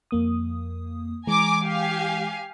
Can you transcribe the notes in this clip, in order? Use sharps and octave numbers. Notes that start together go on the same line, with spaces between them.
F2 A#3 D#6
E3 G#3 G#5 A#5 D6
G4 F5 G#5